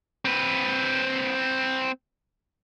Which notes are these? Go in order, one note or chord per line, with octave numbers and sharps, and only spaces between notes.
C4 B4